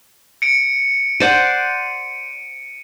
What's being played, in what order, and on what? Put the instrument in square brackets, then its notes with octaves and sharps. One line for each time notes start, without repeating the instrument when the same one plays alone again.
[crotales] C#7 D7
[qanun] C5 D5 F#5 [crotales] D#7